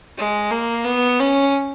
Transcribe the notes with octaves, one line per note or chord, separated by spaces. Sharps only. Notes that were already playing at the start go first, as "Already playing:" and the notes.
G#3
A#3
B3
C#4